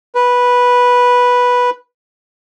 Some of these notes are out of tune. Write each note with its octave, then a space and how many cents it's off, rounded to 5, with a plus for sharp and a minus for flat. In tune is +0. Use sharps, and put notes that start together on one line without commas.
B4 -10